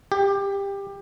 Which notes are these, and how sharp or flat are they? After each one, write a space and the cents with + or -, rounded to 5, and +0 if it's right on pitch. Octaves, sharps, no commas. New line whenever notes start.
G4 +20